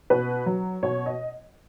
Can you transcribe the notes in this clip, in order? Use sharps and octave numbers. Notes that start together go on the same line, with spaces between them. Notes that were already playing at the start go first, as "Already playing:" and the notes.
B2 B4
F#3
B2 C#5
D#5